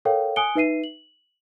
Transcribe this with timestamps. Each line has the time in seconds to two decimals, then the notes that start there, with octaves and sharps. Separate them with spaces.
0.05 A4 A#4 C#5 F5 G5
0.36 G#5 D#6 F#6 C#7 D7 G7
0.55 D#4 B4 E5 C7 D#7
0.84 F#7